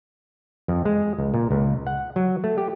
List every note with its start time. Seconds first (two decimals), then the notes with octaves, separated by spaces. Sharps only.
0.68 F2
0.85 G#3
1.18 C#2
1.34 A#2
1.51 C#2
1.87 F#5
2.16 F#3
2.44 A3
2.58 G4